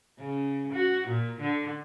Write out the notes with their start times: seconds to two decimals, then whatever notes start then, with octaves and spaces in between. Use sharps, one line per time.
0.20 C#3
0.74 F#4
1.08 A#2
1.41 D3